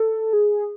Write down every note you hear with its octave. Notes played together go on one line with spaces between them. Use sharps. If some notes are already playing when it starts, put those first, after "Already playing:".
Already playing: A4
G#4